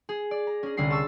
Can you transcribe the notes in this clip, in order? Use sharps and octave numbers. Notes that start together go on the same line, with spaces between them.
G#4
D5
A#5
C#4 G#4
C2 D3 C#4 G#4 C7
A5 C6 C#6 E6 A6